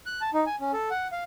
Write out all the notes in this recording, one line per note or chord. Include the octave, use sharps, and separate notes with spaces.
F#6
A5
D#4
G#5
C#4
A4
F#5
F5